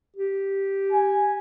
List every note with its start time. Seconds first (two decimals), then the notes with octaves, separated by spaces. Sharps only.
0.16 G4
0.92 G#5